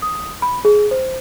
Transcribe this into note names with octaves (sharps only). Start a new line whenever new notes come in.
D#6
B5
G#4
C5